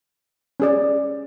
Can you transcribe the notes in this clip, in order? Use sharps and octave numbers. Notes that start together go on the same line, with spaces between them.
C#4 G#4 D5